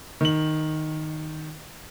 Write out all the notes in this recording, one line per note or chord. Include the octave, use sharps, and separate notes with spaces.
D#3 F#7